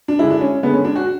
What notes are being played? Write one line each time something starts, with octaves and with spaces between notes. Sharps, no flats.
D4
D3 G#3 E4
D4
C#4
D3 G#3 B3
C#4
D4
F#4